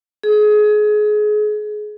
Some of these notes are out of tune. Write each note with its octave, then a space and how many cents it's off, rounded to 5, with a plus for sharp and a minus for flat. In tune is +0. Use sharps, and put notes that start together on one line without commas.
G#4 +25